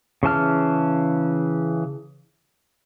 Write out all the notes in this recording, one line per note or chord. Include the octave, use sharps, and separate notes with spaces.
C#3 E3 A5 F6